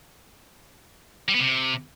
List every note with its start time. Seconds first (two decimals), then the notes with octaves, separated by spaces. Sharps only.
1.29 G3
1.34 B3
1.40 C3